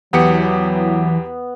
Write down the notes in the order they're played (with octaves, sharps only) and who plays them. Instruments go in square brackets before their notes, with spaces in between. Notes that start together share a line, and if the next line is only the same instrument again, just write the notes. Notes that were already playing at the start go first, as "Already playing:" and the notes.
[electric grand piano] E2 G4 C#7 [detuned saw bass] E3 [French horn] F#3 [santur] B3